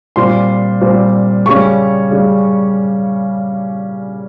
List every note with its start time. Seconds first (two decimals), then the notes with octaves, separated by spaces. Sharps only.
0.16 A#2 G3 C4 C6
0.81 A#2 G3 C4
1.46 C#3 G3 C#4 C#6
2.10 C#3 G3 C#4